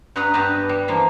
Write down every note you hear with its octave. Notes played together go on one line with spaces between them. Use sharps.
G2 F#4 B4 D#5 A#5
G2 B3 G4 D#5 A5
G3
E3 F3 A#3